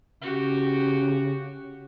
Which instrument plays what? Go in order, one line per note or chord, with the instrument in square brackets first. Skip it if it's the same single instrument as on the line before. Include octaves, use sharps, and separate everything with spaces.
[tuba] C#3 [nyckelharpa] F#4 G4